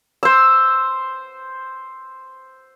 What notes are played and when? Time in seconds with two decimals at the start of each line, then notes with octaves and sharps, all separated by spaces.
0.23 C5 E6